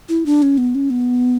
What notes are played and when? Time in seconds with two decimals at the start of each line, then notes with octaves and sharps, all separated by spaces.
0.09 E4
0.26 D4
0.42 C#4
0.58 B3
0.75 C#4
0.90 B3